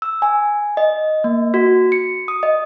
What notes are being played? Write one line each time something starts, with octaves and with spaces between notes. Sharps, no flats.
E6
G#5
D#5
A#3
F#4
C#7
D#6
D#5